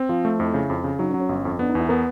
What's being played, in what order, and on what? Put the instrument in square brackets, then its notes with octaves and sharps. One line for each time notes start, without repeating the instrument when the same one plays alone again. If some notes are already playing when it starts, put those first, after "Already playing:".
Already playing: [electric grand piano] C4
[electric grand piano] F3 [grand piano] F4
[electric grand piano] A3
[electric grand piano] F2 [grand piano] E4
[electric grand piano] C#3
F2
C#3
[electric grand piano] F#3 [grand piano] D#4
[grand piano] C#4
[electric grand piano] F#3
[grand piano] C#4
[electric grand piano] G1
F2
[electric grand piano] B3 [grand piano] D4
[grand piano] D#4
[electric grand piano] E2 [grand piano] E4
[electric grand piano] B3 [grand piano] A#4